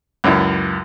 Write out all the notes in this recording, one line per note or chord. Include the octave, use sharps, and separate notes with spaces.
C#2 F#2 E4